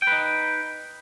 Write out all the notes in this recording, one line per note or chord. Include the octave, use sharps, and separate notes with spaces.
D#4 B4 G5